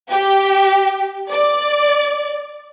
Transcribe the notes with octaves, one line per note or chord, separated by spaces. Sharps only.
G4
D5